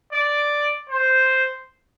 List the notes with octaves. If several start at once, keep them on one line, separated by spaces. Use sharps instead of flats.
D5
C5